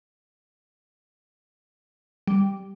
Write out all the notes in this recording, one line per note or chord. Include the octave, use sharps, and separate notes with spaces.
G3